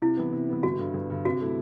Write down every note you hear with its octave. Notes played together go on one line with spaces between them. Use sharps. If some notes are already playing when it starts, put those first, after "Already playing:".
C3 E4
E3 B3
C3
E3 B3
G1 F#4
G2 D3
G1
G2 D3
C3 F#4
F#3 A3 E4